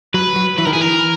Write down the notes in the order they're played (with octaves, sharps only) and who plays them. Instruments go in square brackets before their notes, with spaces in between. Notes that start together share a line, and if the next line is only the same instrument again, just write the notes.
[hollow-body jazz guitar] F#3 [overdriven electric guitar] B4
[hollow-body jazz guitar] F#3
[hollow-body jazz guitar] E3 [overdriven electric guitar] B4
[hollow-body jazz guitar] D#3 [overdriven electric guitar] A#4
[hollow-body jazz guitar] E3 [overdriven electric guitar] G#4
[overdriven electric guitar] A#4